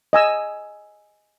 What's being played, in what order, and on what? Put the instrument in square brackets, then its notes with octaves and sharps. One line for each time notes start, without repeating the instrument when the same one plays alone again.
[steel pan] D#5 G#5 E6